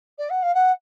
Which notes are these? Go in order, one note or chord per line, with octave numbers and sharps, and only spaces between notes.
D5
F#5
F5
F#5